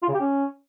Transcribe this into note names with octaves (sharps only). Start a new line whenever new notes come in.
F4
C#3
G4
C#4